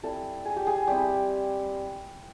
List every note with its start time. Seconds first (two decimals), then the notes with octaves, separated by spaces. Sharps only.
0.03 G3 C4 E4 A4
0.45 G#4
0.56 G4
0.67 G#4
0.87 G3 C4 E4 G4